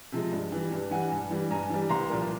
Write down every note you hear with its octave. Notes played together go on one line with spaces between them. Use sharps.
C3 F3 G#3
G2
E3 G3
G2
E3 G3 F#5 G#5
G2
E3 G3
G2 G#5 A#5
E3 G3
C2 A#5 C6
A#2 F3 A#3